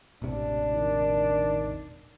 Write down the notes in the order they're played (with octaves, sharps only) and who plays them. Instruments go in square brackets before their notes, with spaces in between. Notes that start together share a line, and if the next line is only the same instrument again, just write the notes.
[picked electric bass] E1 A1 C3 [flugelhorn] D4
[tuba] D#3